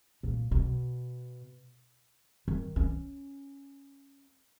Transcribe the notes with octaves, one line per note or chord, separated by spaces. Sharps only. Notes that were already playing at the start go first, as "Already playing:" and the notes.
A#2
B2
D#3
C#4